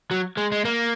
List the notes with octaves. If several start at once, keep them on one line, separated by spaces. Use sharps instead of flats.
F#3
G#3
G#3
A#3